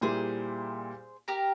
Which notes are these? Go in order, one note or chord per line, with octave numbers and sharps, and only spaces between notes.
A#2 G3 A#3 E4 G#4 C5
G4 A#4